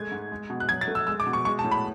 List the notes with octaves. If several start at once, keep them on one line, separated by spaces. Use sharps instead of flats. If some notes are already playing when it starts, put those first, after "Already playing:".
Already playing: G#3 A3 G#6
G#2
G#3
B2
F#6
F#3 G#6
A6
A3
E6
G#3 E6
D6
B2
C#6
G#3 C#6
A5
A2
B5